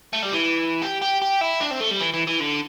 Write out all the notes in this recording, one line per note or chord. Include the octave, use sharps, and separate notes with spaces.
A3
G3
E3
G4
G4
G4
E4
D4
C4
A3
G3
E3
E3
E3
D3